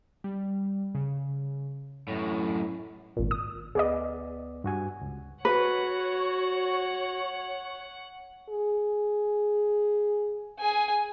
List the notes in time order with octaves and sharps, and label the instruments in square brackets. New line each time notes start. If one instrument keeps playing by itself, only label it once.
[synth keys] G3
C#3
[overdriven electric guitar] F#2 A2
[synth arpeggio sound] G#1 A#2
D#6
[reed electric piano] D2 B3 D5 [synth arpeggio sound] G#4 D#5
[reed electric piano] G2 F#4 G#5
C#2
[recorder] F#4 [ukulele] B4 [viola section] C#5 [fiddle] F#5
[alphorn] G#4
[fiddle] G#4 G#5